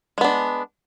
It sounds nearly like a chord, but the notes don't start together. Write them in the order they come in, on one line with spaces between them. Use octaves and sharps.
G#3 B3 D4